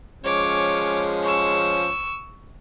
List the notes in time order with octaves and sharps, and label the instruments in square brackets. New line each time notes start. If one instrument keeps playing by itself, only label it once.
[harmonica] F3 G#3 C#4 [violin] C#5 D6
[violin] C#6 E6